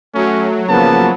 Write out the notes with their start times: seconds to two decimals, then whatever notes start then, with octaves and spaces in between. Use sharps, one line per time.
0.15 F#3 A3 C#4
0.69 C#3 F3 A#3 B3 A5